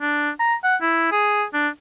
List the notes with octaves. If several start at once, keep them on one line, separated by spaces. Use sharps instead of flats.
D4
A#5
F#5
E4
G#4
D4